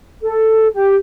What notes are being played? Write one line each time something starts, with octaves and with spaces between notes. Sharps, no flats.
A4
G4